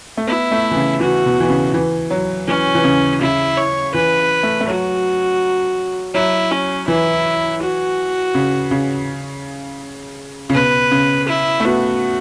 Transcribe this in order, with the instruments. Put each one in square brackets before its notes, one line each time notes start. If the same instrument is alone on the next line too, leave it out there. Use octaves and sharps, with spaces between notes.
[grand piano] A3
[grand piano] B3 [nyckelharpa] E4
[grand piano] A3
E3
C#3
[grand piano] E3 [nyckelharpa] F#4
[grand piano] B2
E3
C#3
E3
F#3
[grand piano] E3 [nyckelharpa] C#4
[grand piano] E3
C#3
[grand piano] C#3 [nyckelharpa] E4
[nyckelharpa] C#5
[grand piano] E3 [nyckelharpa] B4
[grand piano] A3
A3
[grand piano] F#3 [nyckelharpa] F#4
[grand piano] F#3 [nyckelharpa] E4
[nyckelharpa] C#4
[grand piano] E3 [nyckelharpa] E4
[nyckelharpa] F#4
[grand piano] C#3
C#3
C#3
[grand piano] B2 [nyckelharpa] B4
[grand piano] C#3
[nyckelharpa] E4
[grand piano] A3
[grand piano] B3 [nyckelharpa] F#4